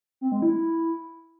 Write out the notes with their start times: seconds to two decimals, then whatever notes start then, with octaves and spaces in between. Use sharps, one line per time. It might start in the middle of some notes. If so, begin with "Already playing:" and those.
0.21 C4
0.32 G#3
0.42 E4